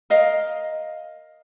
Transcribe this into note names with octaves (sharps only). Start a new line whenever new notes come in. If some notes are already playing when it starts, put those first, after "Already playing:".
A#4 D#5 F5